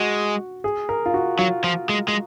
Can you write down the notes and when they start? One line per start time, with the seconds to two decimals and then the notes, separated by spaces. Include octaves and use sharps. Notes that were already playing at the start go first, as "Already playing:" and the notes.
Already playing: G#3 F#4
0.64 G#4
0.89 A#4
1.06 F4
1.14 F#4
1.39 F#3 F4
1.64 F3
1.89 G#3
2.08 G#3